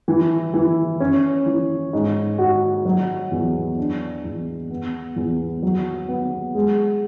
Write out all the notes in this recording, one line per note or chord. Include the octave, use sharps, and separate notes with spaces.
E3
E3
C#4
E3
G#2
F#4
F#3
E2
D4
E2
B3
E2
F#3
B3
G#3